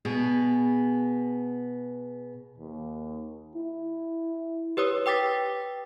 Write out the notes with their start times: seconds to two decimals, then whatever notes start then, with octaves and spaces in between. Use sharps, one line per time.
0.05 B2 B3 G#4
2.58 D#2
3.55 E4
4.77 G4 B4 C#5 D#6
5.06 B4 G5 D6 A6 B6